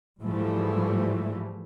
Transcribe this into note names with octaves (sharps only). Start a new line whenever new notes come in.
G#2 E3 F3 G3 A3